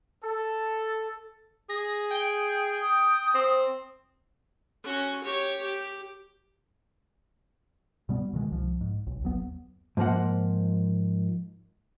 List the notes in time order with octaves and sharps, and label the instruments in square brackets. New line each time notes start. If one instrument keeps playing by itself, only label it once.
[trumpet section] A4
[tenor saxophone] G#4 [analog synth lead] A#6
[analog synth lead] G5
[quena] D#6
[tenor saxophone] C4
[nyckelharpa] C#4 F#4
G4 C#5
G4
[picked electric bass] B2 G3 B3
B2 D#3 F#3 G#3
C2 F3
G#2
B1
G1 D#2 F#3 B3
[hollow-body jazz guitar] G#2 F3 A#3 F#5